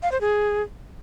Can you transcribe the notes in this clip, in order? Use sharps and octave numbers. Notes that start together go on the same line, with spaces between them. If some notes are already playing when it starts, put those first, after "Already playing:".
F5
C5
G#4